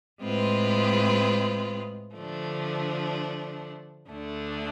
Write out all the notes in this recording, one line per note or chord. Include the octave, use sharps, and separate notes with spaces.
A2 G#3 C4 F4 B4
D3 F3 A3 D4
D2 D3 A3 D4